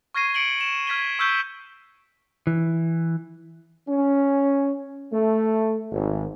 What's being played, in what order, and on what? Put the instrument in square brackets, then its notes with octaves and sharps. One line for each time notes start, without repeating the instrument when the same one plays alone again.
[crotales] C#6 F6 G#6 A#6 C7 D#7
C#7 D7 F#7 G7
E7
F6 G#6 B6 D#7 G7
C#6 E6 F6 G6 B6 G7
[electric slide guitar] E3
[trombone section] C#4
A3
G#1